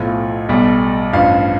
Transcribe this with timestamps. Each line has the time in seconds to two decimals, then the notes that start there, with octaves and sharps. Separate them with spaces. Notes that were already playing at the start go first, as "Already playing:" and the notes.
Already playing: B1 A2 F3
0.49 B1 B2 G3
1.13 A1 G2 F3 F5